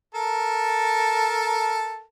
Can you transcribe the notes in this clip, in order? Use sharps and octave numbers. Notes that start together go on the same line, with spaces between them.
A4 A#4 A5